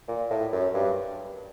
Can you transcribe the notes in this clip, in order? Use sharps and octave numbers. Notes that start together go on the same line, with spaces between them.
A#2
A2
F#2
G2